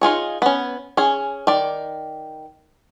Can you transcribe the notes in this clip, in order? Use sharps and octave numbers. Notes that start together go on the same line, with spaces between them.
D#4 F4 G#4 C#5
B3 C#4
C#4 G#4
D#3 D5